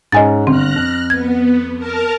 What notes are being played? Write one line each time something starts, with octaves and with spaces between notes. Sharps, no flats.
G#2 C#4 D#5 G#5 A6
G1 C4 F6 F#6 A#6
F2
B3 G#6
A#4 A5 F6